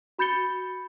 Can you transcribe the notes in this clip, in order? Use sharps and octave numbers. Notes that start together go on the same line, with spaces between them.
F#4 B5 G6 A6 C#7 G7